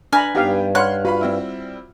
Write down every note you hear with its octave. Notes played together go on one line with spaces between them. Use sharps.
D4 B4 G#5 A#5 B5 F6
G2 B3 D#4 G4 F5 G5
C#5 F#5 B5 C6 F6 F#6
F4 F#4 B4 F5 B5
G3 C4 E4 E5